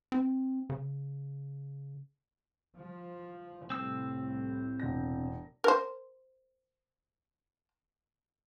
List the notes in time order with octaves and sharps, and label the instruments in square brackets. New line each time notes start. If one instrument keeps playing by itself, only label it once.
[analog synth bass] C4
C#3
[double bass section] F3
[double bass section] C2 A2 [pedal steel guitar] C4 E6
[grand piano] E1 D4 A#6
[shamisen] A#4 C5